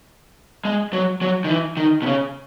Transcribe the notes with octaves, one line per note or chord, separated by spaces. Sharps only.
G#3
F#3
F#3
D#3
E3
D#3
B2
C#3